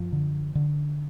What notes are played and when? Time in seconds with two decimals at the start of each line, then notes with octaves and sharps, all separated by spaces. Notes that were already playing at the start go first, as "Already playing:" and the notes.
Already playing: F#2 F3
0.13 D3
0.55 D3